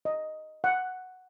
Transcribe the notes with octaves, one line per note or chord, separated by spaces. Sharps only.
D#5
F#5